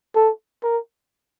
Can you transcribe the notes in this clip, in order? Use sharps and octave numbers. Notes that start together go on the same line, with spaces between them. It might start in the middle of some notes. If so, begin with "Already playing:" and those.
A4
A#4